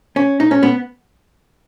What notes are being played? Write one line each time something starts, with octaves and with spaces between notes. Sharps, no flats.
C#4
D#4
C#4
B3